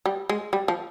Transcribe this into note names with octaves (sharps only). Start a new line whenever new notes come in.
G3
G#3
G3
F3